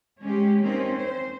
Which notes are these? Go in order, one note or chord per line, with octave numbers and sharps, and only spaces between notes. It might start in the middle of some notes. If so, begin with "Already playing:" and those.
G#3 C#4 G4
A#3 C4 C#4 D#4
C5